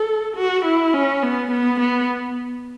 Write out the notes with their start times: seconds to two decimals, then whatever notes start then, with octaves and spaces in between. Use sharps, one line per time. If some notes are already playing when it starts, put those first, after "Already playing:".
Already playing: A4
0.36 F#4
0.65 E4
0.94 C#4
1.23 B3
1.51 B3
1.80 B3